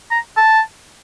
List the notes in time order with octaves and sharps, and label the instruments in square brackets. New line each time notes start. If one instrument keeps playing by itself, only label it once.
[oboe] A#5
A5